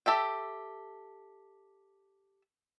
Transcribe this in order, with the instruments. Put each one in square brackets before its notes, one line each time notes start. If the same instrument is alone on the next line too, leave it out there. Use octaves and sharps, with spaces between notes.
[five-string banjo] G4 A4 E5 G5